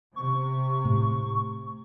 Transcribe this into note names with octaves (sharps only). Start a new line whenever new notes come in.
C3 C#6
A2